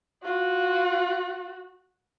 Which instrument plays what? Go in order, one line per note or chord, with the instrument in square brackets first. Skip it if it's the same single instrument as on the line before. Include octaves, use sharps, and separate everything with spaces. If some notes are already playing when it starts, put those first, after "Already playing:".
[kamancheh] F4 [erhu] F#4